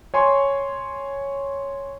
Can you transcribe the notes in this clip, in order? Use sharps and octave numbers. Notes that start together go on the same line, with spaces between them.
C#5 G#5 C6 C#6